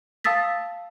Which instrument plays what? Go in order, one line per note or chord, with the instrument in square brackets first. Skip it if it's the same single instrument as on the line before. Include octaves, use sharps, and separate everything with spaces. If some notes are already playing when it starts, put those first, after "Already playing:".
[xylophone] F5 A5 D#6 E6 A6 B6